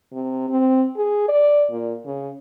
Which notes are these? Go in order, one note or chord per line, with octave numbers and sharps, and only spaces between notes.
C3
C4
G#4
D5
A#2
C#3